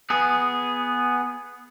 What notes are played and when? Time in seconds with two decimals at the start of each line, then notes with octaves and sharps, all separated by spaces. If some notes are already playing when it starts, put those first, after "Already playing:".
0.10 B3 G#4